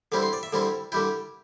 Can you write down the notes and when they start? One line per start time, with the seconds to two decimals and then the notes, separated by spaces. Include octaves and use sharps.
0.12 D3 G3 C4 E4 D6
0.23 C6
0.33 D5
0.43 E5
0.53 D3 G3 C4 E4
0.92 D3 G3 E4 G5